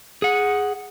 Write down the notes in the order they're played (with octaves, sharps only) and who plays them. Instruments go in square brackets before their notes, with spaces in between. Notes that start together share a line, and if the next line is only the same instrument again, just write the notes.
[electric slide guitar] G#4 F#5